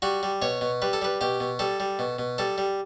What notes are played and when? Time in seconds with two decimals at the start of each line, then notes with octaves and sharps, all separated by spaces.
0.02 G3 F#4
0.23 G3
0.42 B2 C#5
0.61 B2
0.82 G3 B4
0.93 A4
1.02 G3 B4
1.21 B2 G4
1.40 B2
1.59 G3 A4
1.80 G3
1.99 B2
2.19 B2
2.38 G3 A4
2.58 G3